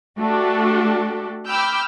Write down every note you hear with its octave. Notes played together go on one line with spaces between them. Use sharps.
A3 D4 F#4 G4 A4
G5 B5 D6 E6 F6 G6